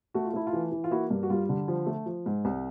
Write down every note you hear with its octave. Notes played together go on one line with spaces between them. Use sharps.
A3 F#4
F4
A3 E4
F4
E3
E3
F4
A#3 E4 F#4
G2
F#4
G3 F4
D3
F3
A3
F3
G#2
C2